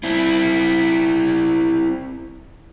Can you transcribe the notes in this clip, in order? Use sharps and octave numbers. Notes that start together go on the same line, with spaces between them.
C4 E4